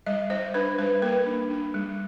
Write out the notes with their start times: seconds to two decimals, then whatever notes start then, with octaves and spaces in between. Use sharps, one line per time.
0.06 G3 D#5
0.30 G3 C5
0.54 D4 B4
0.78 G3 B4
1.02 A#3 A#4
1.26 D4
1.50 D4
1.74 G3